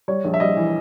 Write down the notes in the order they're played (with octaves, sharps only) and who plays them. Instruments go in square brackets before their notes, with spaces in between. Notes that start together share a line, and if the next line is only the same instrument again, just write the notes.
[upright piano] G3 C#5
A#1
E5
G3 D#5
E3